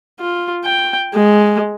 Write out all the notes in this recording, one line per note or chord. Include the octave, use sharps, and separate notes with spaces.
F4
G5
G#3